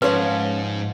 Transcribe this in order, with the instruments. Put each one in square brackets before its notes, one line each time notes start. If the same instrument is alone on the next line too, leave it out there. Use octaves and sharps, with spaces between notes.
[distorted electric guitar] G#2 [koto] F3 F#5 [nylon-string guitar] C#4 C#5 [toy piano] B4